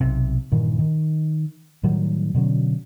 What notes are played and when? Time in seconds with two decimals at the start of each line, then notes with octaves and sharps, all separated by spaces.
0.01 B1 C3
0.52 G2 A#2 D#3 E3
0.79 D#3
1.83 A2 D#3 F#3 G3
2.34 B2 D3 F#3 C#4